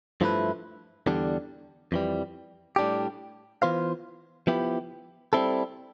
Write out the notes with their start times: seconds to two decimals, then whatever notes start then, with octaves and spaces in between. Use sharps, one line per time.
0.21 G2 F3 A3 E4 B4
1.06 E2 D3 G3 D4
1.92 F2 E3 G3
2.76 A2 G3 D4 G4
3.62 E3 B3 F4 C5 F5
4.47 F3 B3 E4 G4
5.33 G3 C4 E4 A4